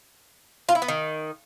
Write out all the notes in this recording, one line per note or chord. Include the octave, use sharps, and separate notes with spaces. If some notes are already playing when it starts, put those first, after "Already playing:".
F4
E4
B3
D#3